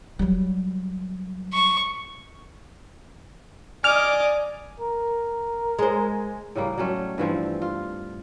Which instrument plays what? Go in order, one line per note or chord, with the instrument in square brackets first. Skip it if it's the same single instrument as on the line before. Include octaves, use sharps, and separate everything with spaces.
[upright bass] F#3 G3
[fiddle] C#6
[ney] D5 [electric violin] D#5 D6 [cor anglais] G#5 [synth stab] F6
[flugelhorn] A#4
[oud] G#3 C5
[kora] A2 C#3 G3 A#3
F#3 G3 A3 C#4
G2 E3 F3 C4
F4